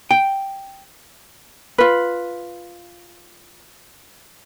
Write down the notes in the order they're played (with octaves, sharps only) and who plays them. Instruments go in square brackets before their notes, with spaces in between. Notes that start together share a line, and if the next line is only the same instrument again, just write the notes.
[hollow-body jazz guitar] G5
[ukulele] F4 B4